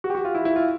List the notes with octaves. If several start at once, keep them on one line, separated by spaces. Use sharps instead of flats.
F#4
G4
F#4
F4
E4
E4
F4